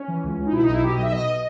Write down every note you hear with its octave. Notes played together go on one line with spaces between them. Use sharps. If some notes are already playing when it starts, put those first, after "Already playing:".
Already playing: C#4
E3
C#2
C#2
D#4
B2 E4
D#4
B1 E4
B2 G4
D#5
B1
E5
B2 D#5